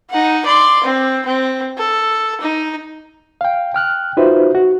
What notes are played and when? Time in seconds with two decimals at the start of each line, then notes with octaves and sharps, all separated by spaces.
0.10 D#4 F#5
0.46 D5 C6
0.84 C4
1.26 C4
1.78 A4
2.42 D#4
3.41 F5 G5
3.74 G5 F6 F#6
4.17 D#4 F4 F#4 B4 C5 E5
4.55 F#4